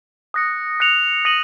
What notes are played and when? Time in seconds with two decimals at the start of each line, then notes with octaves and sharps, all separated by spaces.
0.34 D#6 F#6 A#6 C#7
0.80 F#6 A#6 C#7 F7
1.25 D#6 A#6 D#7 F#7